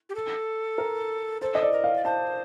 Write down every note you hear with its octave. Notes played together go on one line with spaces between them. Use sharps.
G4
A4
A#4
A4 C5
D#5
D5
A#4
F5
D5
C5 A5